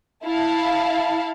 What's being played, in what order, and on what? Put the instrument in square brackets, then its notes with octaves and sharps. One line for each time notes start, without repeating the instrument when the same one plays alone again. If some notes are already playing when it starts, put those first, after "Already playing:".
[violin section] E4 F5 A5